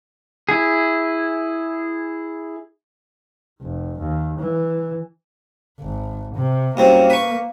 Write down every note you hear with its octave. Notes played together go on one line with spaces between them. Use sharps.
E4 G#4
F1
D#2
E3
G#1
C3
C2 F#2 A#3 C4
B4 C#6